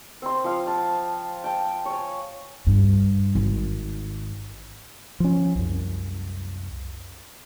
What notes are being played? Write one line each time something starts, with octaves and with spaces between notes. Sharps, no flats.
C4 C6
F3 F5
A5
G5 A5
C#5 G#5
G2
G#1
F3 C#4
C2 F#2